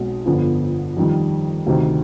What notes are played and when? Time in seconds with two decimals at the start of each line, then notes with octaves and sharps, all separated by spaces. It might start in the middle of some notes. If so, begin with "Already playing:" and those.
Already playing: B1 B2 G#3 C4
0.26 G1 F2 D3 F3 B3
0.97 F2 D#3 G3
1.66 D2 C3 D#3